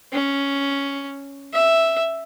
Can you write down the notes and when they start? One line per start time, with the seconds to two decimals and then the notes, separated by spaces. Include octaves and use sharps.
0.12 C#4
1.53 E5